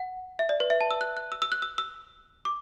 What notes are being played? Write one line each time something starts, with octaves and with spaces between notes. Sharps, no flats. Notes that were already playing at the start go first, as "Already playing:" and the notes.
Already playing: F#5
E5
D5
B4
E5
A5
E6
F#6
F#6
E6
E6
F#6
E6
E6
D6